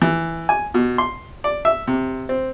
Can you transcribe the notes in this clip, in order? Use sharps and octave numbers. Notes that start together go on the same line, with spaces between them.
E3
G#5
B2
C6
D5
E5
C3
C4